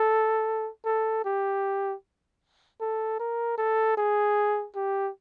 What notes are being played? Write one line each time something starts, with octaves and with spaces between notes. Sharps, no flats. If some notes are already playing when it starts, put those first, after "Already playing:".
Already playing: A4
A4
G4
A4
A#4
A4
G#4
G4